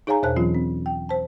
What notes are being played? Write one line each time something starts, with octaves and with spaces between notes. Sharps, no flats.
D#4 G#4 C#5 F5 G#5 A#5
E2 B2 C5 C#5 A5 F#6
E3 F#3 C4 C#4 F4
C4
G5
C5 A5